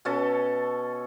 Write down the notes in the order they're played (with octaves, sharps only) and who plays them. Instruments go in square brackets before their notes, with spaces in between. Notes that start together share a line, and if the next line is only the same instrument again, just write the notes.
[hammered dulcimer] B2 C#4 A4 A5